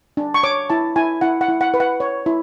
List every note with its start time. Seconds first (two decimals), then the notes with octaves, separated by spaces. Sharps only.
0.17 D4
0.34 C#6
0.43 C#5 D6
0.70 E4 A5
0.96 E4 G#5
1.21 E4 F#5
1.41 F#5
1.49 E4
1.61 F#5
1.74 B4
1.80 F#5
2.00 C#5
2.26 E4